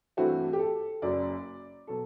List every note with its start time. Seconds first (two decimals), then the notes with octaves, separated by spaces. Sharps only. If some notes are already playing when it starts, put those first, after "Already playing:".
0.17 G2 E3 A3 C4 F#4
0.53 G4
0.59 A4
1.02 F#1 F#2 F#3 D5
1.87 B2 F#3 A4